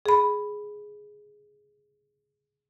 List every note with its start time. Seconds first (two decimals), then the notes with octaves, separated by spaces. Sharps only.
0.06 G#4 B5